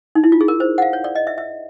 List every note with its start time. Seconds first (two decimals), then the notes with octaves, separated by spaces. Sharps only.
0.15 D#4
0.24 E4
0.32 F4
0.41 G#4
0.48 A#4
0.60 C5
0.78 F#5
0.82 F5
0.93 C#5
1.04 D5
1.15 D#5
1.27 E5
1.38 E5